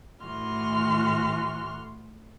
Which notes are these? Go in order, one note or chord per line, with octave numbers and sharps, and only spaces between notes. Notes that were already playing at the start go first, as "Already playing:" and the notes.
A2 E3 A3 F#4 C6 F6